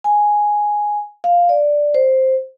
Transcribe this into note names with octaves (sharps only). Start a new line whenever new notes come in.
G#5
F5
D5
C5